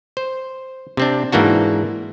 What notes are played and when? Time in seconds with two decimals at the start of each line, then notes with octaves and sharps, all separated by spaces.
0.17 C5
0.97 C3 C4 D4
1.32 G#2 E3 A#3 D4 F#4